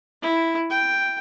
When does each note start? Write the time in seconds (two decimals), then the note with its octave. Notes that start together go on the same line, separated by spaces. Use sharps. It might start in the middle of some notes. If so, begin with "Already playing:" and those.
0.22 E4
0.70 G5